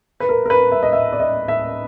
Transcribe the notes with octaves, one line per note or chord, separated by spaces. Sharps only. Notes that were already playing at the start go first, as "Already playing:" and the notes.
B4
A#4
A#4
B4
E5
D#5
E5
D5
D#5
E5